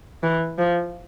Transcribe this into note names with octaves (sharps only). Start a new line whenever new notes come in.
E3
F3